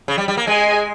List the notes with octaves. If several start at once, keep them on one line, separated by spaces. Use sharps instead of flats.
C#3
G3
G3
A#3
G#3 G#4 D#5 G#5